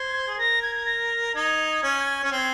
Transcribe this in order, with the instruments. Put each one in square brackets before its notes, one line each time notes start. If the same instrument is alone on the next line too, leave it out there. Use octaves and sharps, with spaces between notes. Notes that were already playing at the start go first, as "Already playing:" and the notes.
Already playing: [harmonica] C5 [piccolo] G#6
[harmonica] G#4
[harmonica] A#4 [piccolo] A#6
[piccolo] G#6
G#6
A#6
[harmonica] D#4 [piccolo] G#6
[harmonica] C#4
C#4
C4